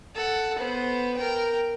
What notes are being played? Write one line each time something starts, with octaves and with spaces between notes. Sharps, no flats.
A4 F#5
B3 C5
A#4 G5